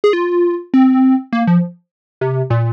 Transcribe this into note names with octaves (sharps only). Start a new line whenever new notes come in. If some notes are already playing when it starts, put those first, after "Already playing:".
G#4
F4
C4
A#3
F3
C3
A#2